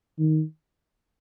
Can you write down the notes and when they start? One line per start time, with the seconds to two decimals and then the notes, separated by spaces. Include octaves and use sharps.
0.19 D#3